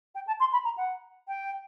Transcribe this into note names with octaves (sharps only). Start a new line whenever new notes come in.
G5
A5
C6
B5
A#5
F#5
G5